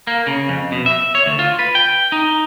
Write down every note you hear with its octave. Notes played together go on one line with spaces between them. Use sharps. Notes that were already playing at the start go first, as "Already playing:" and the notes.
A#3
C#3
F2
B2
E5
C#5
D2
F4
B4
G5
D#4